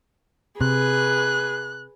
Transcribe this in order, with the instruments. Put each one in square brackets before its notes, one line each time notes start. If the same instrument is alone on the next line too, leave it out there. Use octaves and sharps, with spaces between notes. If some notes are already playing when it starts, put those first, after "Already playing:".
[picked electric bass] C3 [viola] G#4 B4 [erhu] F#6